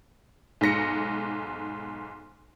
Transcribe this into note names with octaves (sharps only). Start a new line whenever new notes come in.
B1 G#2 A#6 C#7